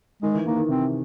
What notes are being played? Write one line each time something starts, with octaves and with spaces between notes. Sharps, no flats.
D#3 G#3
E3
D#3 A#3
D#3
C3 C4